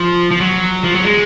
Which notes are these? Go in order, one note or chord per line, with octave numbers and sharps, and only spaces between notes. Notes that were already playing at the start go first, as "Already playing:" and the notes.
Already playing: F3
F3
F#3
F3
F#3
G#3